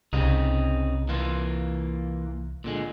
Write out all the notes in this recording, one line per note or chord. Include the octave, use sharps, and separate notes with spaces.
C2 C#3 C4 D#4
E3 A#3 F4
A#2 D3 G#3